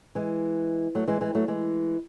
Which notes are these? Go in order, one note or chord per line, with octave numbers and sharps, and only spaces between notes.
E3 G#3
F#3 A3
E3 G#3
E3 G#3
F#3 A3
E3 G#3